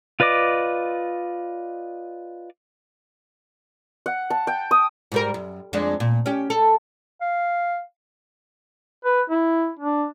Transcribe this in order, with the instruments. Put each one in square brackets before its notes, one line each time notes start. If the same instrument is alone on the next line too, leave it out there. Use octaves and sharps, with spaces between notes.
[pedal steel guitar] F4 B4 D5 D#5 D6
[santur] F#5
A5
G5
D#6
[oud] G#2 G3 A#4
F#2
F2 G#3 D4
A#2
C#4 G4
A4
[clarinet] F5
[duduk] B4
E4
D4